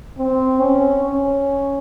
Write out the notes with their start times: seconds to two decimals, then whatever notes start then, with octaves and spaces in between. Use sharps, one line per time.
0.18 C4
0.61 C#4
1.04 C#4